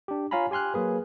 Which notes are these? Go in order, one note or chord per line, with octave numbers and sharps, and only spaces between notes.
D4 G4
F4 C#5 F5 G#5 A#5 B5
G4 G#5 C6 F6 F#6
F#3 A#3 G#4 B4